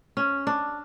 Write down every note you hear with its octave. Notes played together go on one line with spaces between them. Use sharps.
C#4
D4